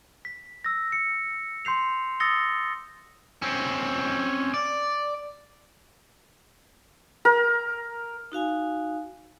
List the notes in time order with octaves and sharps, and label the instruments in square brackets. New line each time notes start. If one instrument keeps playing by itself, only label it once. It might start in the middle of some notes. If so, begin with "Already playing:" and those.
[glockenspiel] B6
E6 A#6
C#7
C6 G6 C7 F7
D#6 E6 A6 A#6 C#7 G7
[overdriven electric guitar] C4 C#4
D5
[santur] A#4
[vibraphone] D#4 F#4 F5 G#5